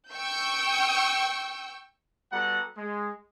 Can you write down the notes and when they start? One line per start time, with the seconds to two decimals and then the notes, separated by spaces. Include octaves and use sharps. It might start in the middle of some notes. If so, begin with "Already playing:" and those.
0.11 G5 C#6 E6 G6
2.32 G3 B3 F#4 A4 F#5 A#5
2.77 G#3